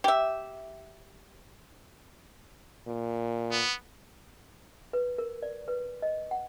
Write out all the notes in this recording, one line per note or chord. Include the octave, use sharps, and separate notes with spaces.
G4 E5
A#2
B3
B4
A#4
D5
B4
D#5
F#5